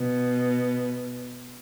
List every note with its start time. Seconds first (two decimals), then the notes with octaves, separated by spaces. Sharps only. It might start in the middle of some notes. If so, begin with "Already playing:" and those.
Already playing: B2